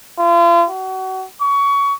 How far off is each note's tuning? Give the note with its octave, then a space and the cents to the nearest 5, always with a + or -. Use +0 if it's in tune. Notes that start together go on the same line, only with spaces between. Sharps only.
F4 -40
F#4 +30
C#6 +25